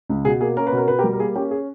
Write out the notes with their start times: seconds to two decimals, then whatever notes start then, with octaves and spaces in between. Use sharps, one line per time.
0.09 C#2
0.25 B2 G#4
0.40 A#3 G#4
0.57 C#4 A#4
0.67 B4
0.72 B2 A#4
0.88 B2 B4
0.98 G4 A#4
1.04 G3
1.13 A#4
1.19 A#3 G#4
1.35 C#4 G4
1.51 G#4